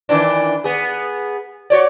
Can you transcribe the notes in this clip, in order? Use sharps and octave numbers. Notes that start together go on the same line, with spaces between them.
D#3 E3 D4
B3 G#4
F#4 C#5 D5